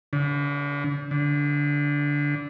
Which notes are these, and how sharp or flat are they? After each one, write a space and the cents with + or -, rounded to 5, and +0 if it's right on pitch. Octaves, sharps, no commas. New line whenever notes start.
D3 -40
D3 -15